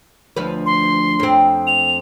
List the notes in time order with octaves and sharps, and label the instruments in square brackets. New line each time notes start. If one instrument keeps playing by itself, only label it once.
[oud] D2 F3 B4
[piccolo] C6
[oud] F2 C4
[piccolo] F7